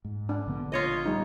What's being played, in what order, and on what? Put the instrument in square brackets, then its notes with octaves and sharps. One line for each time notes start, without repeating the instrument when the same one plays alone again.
[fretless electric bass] G#2
[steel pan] D4
[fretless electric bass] A#1 D3 B3
[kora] F4 C#5 D#5
[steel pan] G3 D#4